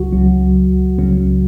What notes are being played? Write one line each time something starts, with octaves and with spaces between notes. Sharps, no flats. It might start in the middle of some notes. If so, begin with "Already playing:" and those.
Already playing: C#2 C#3 F#3 F#4
C#2 C#3 F#3
C#2 C#3 F#3